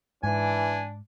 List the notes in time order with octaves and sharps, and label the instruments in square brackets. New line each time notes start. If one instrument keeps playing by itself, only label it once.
[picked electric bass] G#2 [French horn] E3 [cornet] D4 [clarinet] G#5